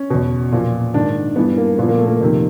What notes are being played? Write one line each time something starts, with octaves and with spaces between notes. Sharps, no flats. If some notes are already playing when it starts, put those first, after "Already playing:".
Already playing: C#4
E2 B2
A#2 F3
G#2 D#3 D4
G2 E3 B3
A#3
A#2 F3 B3
A#3
A3
A#3
F2 C3 D#3